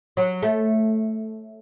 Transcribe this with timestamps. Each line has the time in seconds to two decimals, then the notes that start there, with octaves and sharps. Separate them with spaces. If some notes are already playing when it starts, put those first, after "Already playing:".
0.17 F#3
0.43 A3